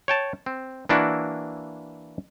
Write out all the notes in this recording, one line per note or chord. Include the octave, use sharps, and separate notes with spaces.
C#5 G5 A5
C4
E3 A#3 D4 E4 F#4